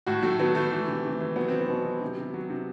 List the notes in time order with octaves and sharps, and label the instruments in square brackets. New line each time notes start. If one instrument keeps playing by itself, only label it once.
[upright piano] A2 F#4
F#3 A3
F#3 B3
F#3 A3
E3
C3
C3
E3
F#3 B3
F#3 C4
B3
B2
F#3
C3
C3
F#3
C3